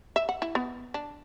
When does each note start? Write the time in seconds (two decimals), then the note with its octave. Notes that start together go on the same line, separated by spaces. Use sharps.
0.16 E5
0.29 F#5
0.42 E4
0.55 B3
0.94 D4